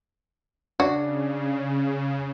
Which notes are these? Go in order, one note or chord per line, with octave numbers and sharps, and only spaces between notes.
C#3 D4 F#4